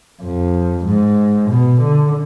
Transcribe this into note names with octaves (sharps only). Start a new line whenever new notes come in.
F2
G#2
B2
D3